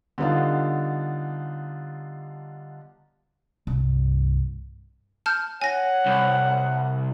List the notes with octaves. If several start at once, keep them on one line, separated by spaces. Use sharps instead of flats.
D3 G3 B3 D4 D#4 F4
C2 G2
A5 F6 G6
C#5 F#5 G#5 A#6
C2